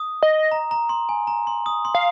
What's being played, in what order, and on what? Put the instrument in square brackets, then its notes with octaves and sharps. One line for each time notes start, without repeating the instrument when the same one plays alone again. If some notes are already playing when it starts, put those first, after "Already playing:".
Already playing: [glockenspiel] D#6
[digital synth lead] D#5
[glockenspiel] A#5
A#5
C6
G#5
A#5
C6
D#6
C6
[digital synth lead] F5